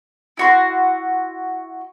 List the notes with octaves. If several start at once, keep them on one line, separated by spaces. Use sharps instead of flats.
E4 F#4 C6